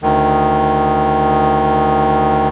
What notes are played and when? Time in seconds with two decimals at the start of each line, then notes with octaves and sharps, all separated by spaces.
0.02 D2 D#3